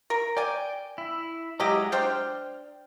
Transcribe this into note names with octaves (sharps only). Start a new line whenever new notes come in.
A#4
D5 G5 G#5
E4
F#3 G#3 E4 G4 D#5 A#5
D4 C5 G5 F6 G6